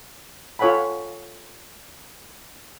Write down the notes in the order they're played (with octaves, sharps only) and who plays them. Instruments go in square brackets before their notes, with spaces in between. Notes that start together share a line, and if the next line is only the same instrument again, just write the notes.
[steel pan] F4 A4 C#5 F#5 G#5 B5